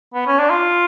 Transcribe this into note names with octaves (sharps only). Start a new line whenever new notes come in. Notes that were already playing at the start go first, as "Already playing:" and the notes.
B3
C#4
D4
F4